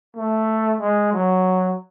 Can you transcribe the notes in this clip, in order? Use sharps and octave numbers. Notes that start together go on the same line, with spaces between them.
A3
G#3
F#3